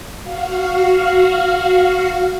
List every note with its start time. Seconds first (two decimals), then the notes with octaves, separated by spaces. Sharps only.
0.23 F#4 F5